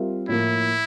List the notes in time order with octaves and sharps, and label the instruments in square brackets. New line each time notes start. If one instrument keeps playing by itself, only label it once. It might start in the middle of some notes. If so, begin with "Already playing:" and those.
Already playing: [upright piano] G3 C4 F4 A#4 E5
[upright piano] A2 F3 A#3 [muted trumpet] E4